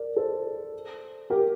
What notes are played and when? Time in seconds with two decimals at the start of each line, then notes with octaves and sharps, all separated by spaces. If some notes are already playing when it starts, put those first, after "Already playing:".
Already playing: A#4 D5
0.16 A4 C5
1.30 G4 A#4